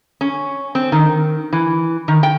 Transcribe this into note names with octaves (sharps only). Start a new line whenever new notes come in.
C#4
C4
D#3
E3
D#3
G5